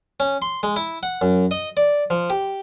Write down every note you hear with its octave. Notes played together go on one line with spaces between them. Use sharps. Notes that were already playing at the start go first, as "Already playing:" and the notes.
C#4
C6
G#3
E4
F#5
F#2
D#5
D5
F3
G4